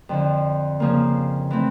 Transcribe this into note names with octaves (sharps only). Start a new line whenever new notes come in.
F2 D3 F3
C#3 F3 A#3
E3 A3 C4